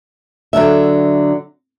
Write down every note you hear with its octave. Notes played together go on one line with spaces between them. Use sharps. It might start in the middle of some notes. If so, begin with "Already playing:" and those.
D3 F#3 D4 E5